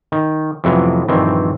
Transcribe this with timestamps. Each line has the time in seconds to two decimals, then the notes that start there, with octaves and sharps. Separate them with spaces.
0.12 D#3
0.64 F2 A2 C3 E3 F#3 B3
1.08 A#1 G2 D#3 E3 C4